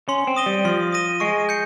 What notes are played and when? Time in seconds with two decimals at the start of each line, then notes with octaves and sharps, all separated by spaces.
0.08 C#4 C6
0.27 C4
0.36 D#6 A#6 D#7 G7
0.46 G3
0.65 F3 C6
0.92 D#6 A#6 D#7 G7
1.20 G#3 C#6
1.49 G6 C#7